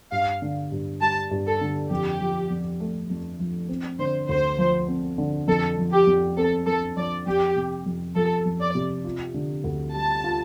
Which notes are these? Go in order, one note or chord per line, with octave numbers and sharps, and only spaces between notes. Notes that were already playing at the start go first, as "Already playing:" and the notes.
G2 F5
D3
G2
G3 A5
G2
A4
D3
F2 G4
F3
F2
A3
F2
F3
C4
D3 C5
D2 C5
F3
C4
D3
F2 A4
F3
G4
F2
C4 A4
F2 A4
F3 D5
F2 G4
C3
F2
F3 A4
F2
D5
C3
F4
D3
D2
G3 A5
F4